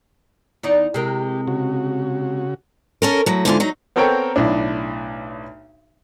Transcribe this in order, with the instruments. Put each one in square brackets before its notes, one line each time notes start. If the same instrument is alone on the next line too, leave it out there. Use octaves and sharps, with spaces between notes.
[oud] E2 D#4 D5
[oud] C3 G#3 A#4 [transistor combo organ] G4
[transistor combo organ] C#3 F#4
[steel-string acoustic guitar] C#4 A4 A#4
A2 F#3
G#2 D3 E3 F4
F#3 D#4
[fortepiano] B3 C4 A4 A#4 C#5 G5
B1 A2 D4